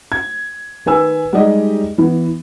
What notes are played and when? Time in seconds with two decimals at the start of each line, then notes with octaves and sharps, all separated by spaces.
0.12 G#6
0.86 D#3 B4 G#5 E6
1.33 G3 G#3 D#4 G4 D5 D#5
1.98 E3 B3